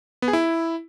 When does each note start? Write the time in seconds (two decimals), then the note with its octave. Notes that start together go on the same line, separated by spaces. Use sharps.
0.22 B3
0.28 G#4
0.33 E4